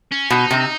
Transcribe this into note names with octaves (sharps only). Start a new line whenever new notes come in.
C#4
B2 D#4
C3